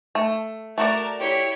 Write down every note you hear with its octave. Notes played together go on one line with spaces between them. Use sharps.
A3
A3 F#4 A#4 D5 A5
E4 G4 C#5